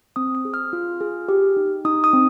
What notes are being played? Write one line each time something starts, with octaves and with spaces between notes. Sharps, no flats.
C4 D#6
D#6
G#4
F6
F4
G#4
G4
D#4
D#4 D#6
D#6
C4